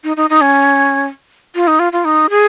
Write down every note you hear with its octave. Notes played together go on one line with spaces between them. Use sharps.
D#4
D#4
D#4
C#4
F4
D#4
F4
F4
D#4
G#4